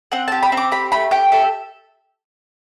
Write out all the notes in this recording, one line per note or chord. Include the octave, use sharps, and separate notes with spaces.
C4 F#5
G4 A5
B5
C4
D6
G4 B5
A3 B5
G4 G5
A4 E5